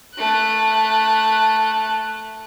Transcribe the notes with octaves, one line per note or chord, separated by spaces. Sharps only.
A3 F#6